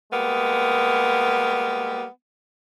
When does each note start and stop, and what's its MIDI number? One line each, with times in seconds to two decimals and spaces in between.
0.11 2.04 55
0.11 2.04 56
0.11 2.04 58
0.11 2.04 59